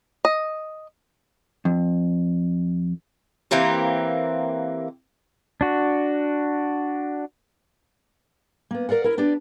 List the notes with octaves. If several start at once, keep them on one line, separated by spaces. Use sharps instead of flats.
D#5
F2
E3 A#3 C4 G4
D4 F#4
A#3 B3
A#4 D5 F5 F#5
E4 A#4
B3 D4 G4 D5